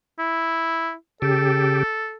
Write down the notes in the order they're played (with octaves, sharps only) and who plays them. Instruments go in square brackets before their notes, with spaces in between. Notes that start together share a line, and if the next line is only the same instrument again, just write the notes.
[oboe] E4
[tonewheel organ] C#3 G4 [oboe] A4